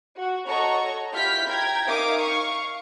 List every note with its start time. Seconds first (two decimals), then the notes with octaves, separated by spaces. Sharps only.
0.17 F#4
0.47 F#4 A4 C#5 D#5 A#5 C#6
1.13 E4 F4 G4 F6 G6 B6
1.46 G5 A#5 G#6
1.87 D#4 A#4 E5 F5 D6 D#6
2.20 F5 C#6